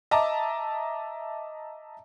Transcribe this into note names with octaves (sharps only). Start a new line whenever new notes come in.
D#5 E5 A5 A#5 D6